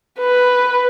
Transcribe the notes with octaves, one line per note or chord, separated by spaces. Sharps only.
B4